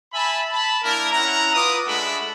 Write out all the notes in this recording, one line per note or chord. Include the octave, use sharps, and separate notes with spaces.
E5 G#5 A5 B5
A5 B5
A#3 D4 E4 A#4
C#4 E4 F#5 A#5
F4 B4 D6 D#6
G#3 A3 D4 E5 F#5 B5